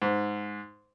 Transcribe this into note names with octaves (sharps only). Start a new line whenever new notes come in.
G#2